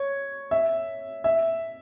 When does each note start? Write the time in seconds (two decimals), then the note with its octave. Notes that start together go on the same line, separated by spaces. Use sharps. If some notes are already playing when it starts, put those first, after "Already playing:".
Already playing: C#5
0.51 E5
1.24 E5